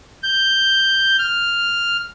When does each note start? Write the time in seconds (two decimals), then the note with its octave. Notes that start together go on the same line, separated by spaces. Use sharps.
0.23 G6
1.19 F6